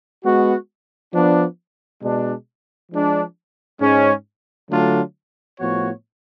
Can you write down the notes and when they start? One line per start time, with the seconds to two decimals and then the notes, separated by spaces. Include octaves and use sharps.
0.24 G#3 B3 F#4
1.13 F3 B3 D4
2.02 B2 G#3 D4
2.92 F3 G#3 D4
3.80 G#2 G#3 C#4
4.70 D3 F#3 A3 D4 F4
5.59 A2 F3 B3 F#4 C#5